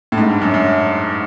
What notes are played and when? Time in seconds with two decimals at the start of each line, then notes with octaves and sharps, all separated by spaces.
0.12 A2
0.18 G#2
0.29 G2
0.42 F#2
0.54 F#2